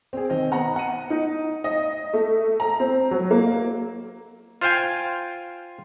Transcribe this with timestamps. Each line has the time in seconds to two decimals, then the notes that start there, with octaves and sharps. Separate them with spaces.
0.13 C4 G#4
0.30 D#3 C4 D#5
0.51 B3 F#5 A#5
0.76 F#5 D#7
1.10 D#4
1.64 D#5
2.13 A3
2.60 A#5
2.80 C4
3.11 F#3
3.31 A#3
4.61 F4 C5 F5 G5 G#5